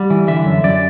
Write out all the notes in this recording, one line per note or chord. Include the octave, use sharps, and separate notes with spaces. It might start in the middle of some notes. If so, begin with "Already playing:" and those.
Already playing: G3 F#5
E3
D3 E5
F#2
F#2 D5